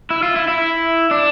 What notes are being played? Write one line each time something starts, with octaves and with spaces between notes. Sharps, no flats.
E4
F4
E4
E4
D4